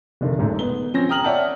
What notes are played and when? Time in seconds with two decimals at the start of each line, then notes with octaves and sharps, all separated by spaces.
0.21 F1 D3 D#3
0.38 D#1 G#2 A3
0.59 B3 G7
0.94 F3 C4 C#4 A#6
1.09 G5 A#5 D#6 F6 F#7
1.24 C#5 D5 E5 F#5 G5 A5